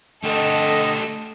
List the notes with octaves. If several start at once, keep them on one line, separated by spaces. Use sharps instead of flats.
D3 A3 G4 A4 D#5